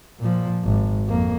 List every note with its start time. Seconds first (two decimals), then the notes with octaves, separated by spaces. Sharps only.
0.19 A#2 F3
0.64 G#1
1.08 F2 A#3